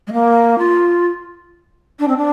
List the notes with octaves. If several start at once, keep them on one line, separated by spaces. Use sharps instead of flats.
G#3
A#3
F4
D4
C4
D4